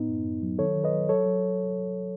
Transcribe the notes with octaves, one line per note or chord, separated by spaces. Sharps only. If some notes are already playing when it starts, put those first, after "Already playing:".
Already playing: A2 B3 D#4
F#2
F#2
F#3
D#3 A4 C#5
D#3
B4 D#5
F#3
F#3 A4 C#5
F#3